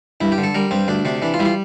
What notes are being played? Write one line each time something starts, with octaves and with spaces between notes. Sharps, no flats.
G2 E4
G4
D3
A4
G3 A#4
G2 C4
D2 D4
C3 D4
E3 D4
F4
G3 E4
F4